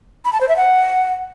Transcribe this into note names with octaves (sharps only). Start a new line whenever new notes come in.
B5
A5
C5
E5
F#5